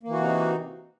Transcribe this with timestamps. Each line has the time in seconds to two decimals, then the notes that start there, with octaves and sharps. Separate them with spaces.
0.03 A#3
0.08 E3
0.13 F#4
0.18 C3
0.22 D#4